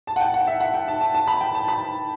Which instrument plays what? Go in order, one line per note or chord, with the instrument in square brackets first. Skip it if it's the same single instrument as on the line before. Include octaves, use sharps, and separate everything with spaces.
[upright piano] A5
F#5
G5
F#5
E5
F#5
G5
A5
A5
A5
B5
G5
A5
B5